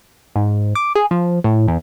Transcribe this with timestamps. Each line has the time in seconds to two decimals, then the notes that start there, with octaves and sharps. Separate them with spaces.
0.36 G#2
0.75 D6
0.95 G#4
1.11 F3
1.44 A2
1.68 E2